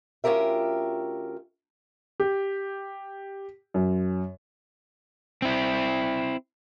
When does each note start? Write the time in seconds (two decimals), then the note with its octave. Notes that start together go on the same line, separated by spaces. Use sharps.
0.24 D2 C#4 F4 G4 A#4 E5
2.20 G4
3.74 F#2
5.42 C4 E4